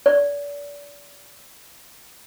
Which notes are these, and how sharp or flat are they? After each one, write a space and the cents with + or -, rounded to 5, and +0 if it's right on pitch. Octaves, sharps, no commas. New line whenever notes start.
D5 -35